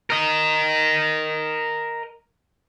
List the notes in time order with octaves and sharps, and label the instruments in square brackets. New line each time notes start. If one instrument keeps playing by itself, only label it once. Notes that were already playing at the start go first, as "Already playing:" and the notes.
[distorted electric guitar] A#4 D#5